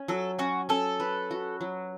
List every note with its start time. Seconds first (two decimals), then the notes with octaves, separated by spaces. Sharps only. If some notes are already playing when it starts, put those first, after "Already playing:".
Already playing: C#4
0.08 F#3 A4
0.39 C#4 F#4
0.69 C#4 A4
1.00 B4
1.31 F#4
1.61 F#3